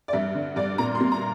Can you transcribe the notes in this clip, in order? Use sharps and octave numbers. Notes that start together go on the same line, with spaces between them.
D5
G2 E5
D3
G2 D5
A#2 A#5
C6
A#3
A#5